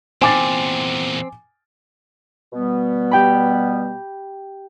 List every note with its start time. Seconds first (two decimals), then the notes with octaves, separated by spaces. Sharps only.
0.22 E2 A#2 C4 G#5 D6 A6
2.53 B2 G3 B3
3.11 G4 G5 B5